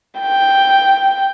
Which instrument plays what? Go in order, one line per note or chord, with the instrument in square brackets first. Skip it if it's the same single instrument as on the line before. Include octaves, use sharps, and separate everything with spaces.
[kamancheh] G5